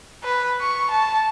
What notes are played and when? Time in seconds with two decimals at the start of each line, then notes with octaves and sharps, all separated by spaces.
0.24 B4
0.61 C#6
0.90 A5